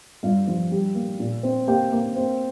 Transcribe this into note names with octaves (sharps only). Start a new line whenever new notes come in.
G2 F4 F5
F3
G3
A#3
A#2
C4
A#3 G4 G5
A#3
C4